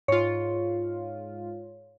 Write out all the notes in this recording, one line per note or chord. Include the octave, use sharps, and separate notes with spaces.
G#2 F4 C#5